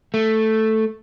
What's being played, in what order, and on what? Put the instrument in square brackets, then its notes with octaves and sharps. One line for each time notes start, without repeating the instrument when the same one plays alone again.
[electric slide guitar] A3